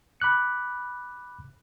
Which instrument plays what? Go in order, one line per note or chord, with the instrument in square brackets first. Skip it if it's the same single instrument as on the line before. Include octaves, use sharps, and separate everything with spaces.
[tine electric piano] B5 D6 F#6 C#7